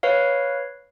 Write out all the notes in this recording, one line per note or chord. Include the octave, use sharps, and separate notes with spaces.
B4 C#5 F5